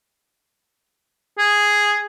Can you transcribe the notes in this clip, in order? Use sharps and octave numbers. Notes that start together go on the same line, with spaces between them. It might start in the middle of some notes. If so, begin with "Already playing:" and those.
G#4